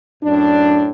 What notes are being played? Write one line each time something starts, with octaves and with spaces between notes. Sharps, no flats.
F#2 A2 D4